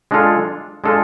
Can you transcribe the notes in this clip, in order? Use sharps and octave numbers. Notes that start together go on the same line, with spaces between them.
G#3 D4 F4 A4
G#3 D4 F4 A4